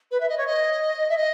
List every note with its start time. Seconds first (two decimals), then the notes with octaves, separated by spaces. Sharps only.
0.11 B4
0.20 E5
0.29 D#5
0.38 C#5
0.47 D#5
1.09 E5
1.17 D#5